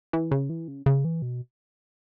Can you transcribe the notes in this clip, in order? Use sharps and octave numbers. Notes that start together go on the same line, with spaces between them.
E3
C#3
E3
C#3
C#3
E3
B2